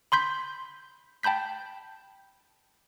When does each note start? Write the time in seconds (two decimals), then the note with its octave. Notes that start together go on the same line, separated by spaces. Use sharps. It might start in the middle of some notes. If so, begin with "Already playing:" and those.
0.12 B5 C6 G6 B6
1.23 G5 A5 B5 G6 B6